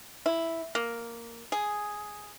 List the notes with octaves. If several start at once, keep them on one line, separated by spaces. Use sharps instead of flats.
E4
A#3
G#4